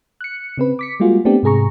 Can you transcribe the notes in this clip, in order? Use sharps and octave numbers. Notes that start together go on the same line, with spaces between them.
F#6 C#7
C#3 C4 B4
D6 B6 C#7
G3 G#3 A#3 F4 F#4 G#4
A3 B3 C4 D4 G4
G#2 C3 G#4 A#5 C#6